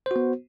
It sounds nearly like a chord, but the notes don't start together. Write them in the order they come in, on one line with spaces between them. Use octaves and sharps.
C5 F#4 B3